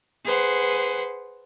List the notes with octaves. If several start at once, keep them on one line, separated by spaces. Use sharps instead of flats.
G#4 B4 C5 F#5